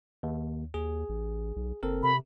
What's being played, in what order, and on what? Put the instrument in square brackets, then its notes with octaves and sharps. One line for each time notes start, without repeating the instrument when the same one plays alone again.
[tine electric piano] D#2
[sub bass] D#2 [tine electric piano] G#4
[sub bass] A1
B1
[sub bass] F#1 [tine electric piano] C4 A4 A#4
[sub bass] C3 [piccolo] B5